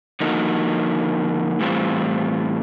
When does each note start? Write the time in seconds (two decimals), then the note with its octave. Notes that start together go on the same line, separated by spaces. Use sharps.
0.20 D3 F3 A#3 D#4 F#4
1.60 A2 E3 G3 C4 F4